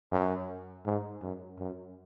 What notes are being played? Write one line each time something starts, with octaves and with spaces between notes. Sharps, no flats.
F#2
G#2
F#2
F#2